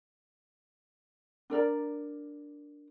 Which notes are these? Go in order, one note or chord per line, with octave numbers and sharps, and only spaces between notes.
D4 A#4 D5 A#5